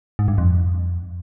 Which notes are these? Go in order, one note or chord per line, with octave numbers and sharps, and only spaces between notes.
G#2
G2
F2